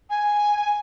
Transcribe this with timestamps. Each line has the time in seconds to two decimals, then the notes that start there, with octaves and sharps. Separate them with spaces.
0.10 G#5